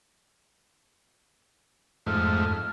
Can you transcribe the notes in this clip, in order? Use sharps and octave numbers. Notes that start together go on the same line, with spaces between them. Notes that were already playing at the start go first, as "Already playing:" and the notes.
F2 G#2 A3 F6